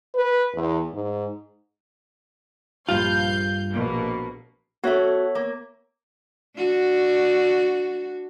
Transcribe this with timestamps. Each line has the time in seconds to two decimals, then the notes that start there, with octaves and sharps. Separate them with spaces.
0.15 B4
0.55 E2
0.93 G#2
2.89 A#1 G2 F4 F5 G6
3.71 A#1 B2 A#3
4.84 B3 F#4 A4 C#5 E5
5.35 A#3
6.56 D4 F#4